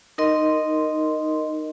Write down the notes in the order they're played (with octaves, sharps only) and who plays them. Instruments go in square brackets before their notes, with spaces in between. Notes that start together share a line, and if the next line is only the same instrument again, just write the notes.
[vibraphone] D#4 A#4 D#5 C6